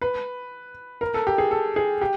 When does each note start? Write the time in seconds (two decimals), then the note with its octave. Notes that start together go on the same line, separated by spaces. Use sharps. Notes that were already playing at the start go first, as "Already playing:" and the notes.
0.01 B4
1.01 A#4
1.14 A4
1.27 G4
1.38 G#4
1.51 A4
1.76 G#4
2.01 G4